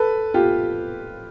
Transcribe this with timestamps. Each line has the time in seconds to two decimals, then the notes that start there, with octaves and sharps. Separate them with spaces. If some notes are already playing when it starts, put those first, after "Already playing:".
Already playing: A4 B4
0.34 F4 G4